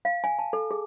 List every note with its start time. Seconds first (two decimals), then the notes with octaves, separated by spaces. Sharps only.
0.05 F5
0.24 G#5
0.39 A5
0.53 A4
0.71 G#4